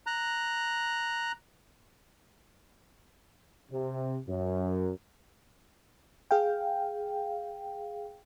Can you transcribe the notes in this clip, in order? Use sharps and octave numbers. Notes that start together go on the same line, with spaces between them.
A#5 F#6
C3
F#2
G#4 F5 G5